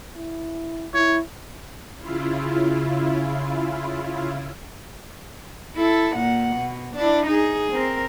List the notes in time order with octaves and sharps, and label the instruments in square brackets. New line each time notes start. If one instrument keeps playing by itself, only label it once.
[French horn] E4
[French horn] E4 [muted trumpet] C#5
[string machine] C#3 E4 F4
[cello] E4 A4
A#2 F#5
B2
D4 E4
D#4 G#4
C4 A#4